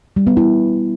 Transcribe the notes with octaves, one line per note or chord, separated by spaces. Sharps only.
G3
B3
E4